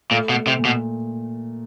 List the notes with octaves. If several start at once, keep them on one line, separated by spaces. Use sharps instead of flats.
A#2 A3
B2
A3
C3
A#2
B2